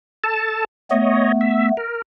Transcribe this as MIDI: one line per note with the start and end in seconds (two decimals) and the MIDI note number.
0.24 0.65 69
0.24 0.65 81
0.91 1.71 57
0.91 1.71 59
0.91 1.32 73
0.91 1.32 75
1.41 1.69 76
1.77 2.02 70